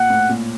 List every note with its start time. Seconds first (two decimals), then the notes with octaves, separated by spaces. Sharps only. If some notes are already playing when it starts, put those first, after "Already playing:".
Already playing: A#2 F#5
0.10 A2
0.29 A#2